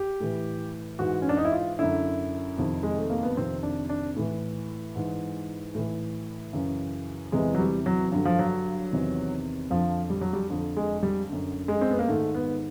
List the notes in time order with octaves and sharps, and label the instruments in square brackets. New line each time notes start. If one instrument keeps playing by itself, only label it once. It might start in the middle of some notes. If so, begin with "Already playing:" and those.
Already playing: [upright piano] G4
A2 E3
G#2 E3 F#4
C#4
D4
D#4
E4
F4
F#2 D3 E4
F2 C3 D#3
G#3
A3
A#3
B3
F2 C3 D#3 C4
D4
D4
A2 E3
G#2 E3
A2 E3
F#2 C#3 E3
E2 C3 E3 G#3
F#3
G3
F#3
G2 D3 F#3
F3
F#3
E2 C3 D#3
F2 D3 F3
G3
F#3
G3
F2 D3
G#3
G3
F#2 D3
G#3
C4
B3
A#3
G#2 D#3 A3
B3